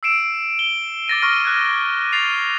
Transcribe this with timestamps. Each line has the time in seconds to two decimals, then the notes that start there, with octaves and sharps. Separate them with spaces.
0.03 E6 C7 D7 E7
0.59 G7
1.08 D6 A6 A#6 D#7
1.22 C#6 D6 F6 A#6 D#7
1.45 F6 F#6 G#6
2.13 A6 C7 F7